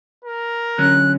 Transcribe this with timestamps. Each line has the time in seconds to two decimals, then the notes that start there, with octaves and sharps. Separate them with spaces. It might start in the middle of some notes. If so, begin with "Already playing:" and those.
0.25 A#4
0.78 D3 F#3 C#4 F#6